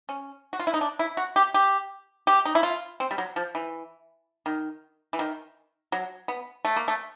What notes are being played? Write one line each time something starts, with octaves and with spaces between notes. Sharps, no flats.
C#4
F#4
F4
E4
D#4
D4
E4
F#4
G4
G4
G4
D#4
E4
F4
C4
G3
F#3
F3
E3
D#3
E3
D#3
F#3
B3
A3
A#3
A3